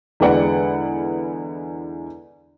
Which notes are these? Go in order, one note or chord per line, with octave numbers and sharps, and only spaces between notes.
E2 D3 G#3 B4 D5 F#5